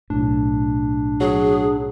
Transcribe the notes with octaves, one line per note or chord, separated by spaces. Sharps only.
B1 A2 D4
F#3 G#4